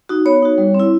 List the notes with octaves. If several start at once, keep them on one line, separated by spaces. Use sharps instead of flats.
D#4 F#4
B3 C#5
D#4 F#4
G3
C4
E4